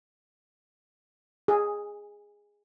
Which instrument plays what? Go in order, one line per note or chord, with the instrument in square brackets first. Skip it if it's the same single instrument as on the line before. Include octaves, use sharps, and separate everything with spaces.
[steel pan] G#4